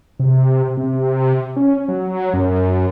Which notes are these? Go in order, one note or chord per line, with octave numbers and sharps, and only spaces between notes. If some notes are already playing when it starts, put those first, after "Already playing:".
C3
C3
C#4
F#3
F#2